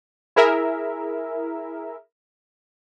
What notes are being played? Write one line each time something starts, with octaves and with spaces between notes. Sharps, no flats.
E4 G#4 A#4 E5